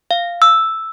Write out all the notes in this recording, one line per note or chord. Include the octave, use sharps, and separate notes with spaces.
F5
E6